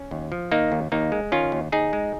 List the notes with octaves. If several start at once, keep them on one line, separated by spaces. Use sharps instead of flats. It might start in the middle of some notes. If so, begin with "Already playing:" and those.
Already playing: C#4
D#2
F3
D#3 A#3 D#4
D#2
D#2 A#3 D#4
G#3
D#3 C#4 F4
D#2
D#2 D#4 G#4
G#3